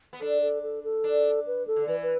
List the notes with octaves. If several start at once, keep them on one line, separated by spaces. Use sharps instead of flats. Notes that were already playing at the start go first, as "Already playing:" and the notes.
B3
D4 A4
A4
A4
A4
D4
B4
A4
D3
E3 B4
B4